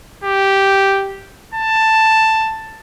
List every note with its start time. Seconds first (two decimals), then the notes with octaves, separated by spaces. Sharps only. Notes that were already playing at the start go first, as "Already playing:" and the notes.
0.24 G4
1.54 A5